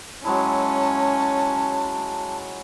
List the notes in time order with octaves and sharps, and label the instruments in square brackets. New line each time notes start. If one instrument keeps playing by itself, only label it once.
[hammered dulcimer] F#3 G#3 E4 [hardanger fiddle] C#4 [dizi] A5